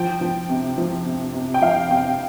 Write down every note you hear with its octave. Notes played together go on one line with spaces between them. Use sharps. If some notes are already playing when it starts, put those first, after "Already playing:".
Already playing: F3 G5
F3
C3
F3
C3
C3
G5
F3 F5
C3 G5